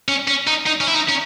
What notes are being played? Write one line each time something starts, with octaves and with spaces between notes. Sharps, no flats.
C#4
C#4
D#4
D#4
C#4
E4
D#4
C#4